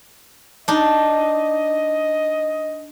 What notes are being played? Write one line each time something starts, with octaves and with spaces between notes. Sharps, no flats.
D4 D#4 D#5